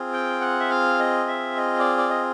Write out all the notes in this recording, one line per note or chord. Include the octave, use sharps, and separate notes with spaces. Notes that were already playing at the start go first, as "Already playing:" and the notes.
Already playing: C4 F4 G#4
G5
F#5
E5
F5
D#5
E5
D#5
D5
D5
D#5